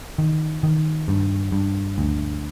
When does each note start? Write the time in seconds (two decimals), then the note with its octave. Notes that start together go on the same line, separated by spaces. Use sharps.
0.18 D#3
0.63 D#3
1.08 G2
1.52 G2
1.98 D2